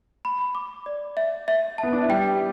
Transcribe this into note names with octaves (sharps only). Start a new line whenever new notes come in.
B5
D6
D5
E5
E5
B3 A5
D4
E4
G3 G4 G5